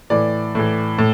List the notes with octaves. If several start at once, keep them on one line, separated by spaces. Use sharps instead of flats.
A2 E3 D5
A2 E3
A2